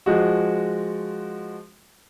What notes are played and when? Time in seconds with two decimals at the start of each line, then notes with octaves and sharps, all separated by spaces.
0.06 F3 G#3 F#4